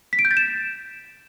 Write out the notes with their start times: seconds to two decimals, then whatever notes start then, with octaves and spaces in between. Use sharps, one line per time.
0.13 B6
0.19 D7
0.25 G6
0.31 A6
0.37 E7